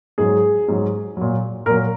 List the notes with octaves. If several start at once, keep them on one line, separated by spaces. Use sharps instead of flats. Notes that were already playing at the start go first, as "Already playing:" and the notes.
G#2 F#3 G#4
G#2 F#3
A#2 F#3
A#2 F#3 A#4